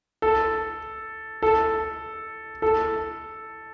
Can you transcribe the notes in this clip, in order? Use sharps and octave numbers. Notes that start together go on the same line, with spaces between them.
A4
A4
A4